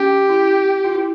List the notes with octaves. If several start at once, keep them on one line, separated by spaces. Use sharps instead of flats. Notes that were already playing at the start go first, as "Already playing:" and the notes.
Already playing: C#4 G4
E4
F4
E4